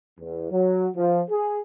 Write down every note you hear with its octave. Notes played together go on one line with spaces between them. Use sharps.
E2
F#3
F3
G#4